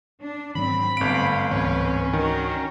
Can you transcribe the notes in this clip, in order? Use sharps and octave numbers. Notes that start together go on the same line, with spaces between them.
D4
G#2 D#3 F#3 C4 B5
G1 A3 C4 F5 D7
C#2 G#2 E3 C4 C#4 B4
D#3 D4 F#4 A#4